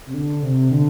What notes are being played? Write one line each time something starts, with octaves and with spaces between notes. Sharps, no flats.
C3
D3
C3
D3